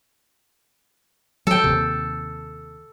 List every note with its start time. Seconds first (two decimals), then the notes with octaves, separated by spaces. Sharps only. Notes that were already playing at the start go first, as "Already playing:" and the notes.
1.47 F#3 A4 G5
1.64 D#2 C3